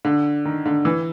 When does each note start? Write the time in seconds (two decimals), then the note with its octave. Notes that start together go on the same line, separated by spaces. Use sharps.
0.05 D3
0.45 D#3
0.66 D3
0.85 E3